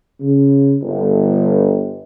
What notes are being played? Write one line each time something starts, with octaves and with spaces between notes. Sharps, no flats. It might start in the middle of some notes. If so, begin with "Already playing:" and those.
C#3
G1